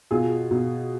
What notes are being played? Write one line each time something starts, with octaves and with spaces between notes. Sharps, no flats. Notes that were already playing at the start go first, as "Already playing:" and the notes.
B2 F4 G#4
B2